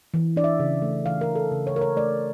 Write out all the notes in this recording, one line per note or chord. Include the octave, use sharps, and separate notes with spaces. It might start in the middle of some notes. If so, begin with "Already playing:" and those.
E3
D4 D5
E5
C#3
A3
E3 F5
A#4
D4
A4
C#3
C#5
A3 A#4
C#5
A3 D5